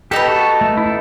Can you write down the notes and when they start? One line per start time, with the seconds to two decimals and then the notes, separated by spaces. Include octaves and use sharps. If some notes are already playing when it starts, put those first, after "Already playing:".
0.11 B3 D#4 G4 A4
0.28 F#4
0.61 A3
0.77 E4